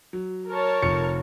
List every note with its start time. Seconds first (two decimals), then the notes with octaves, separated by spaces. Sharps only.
0.13 F#3
0.50 A#4 C#5 A5
0.82 F1 F3 C#7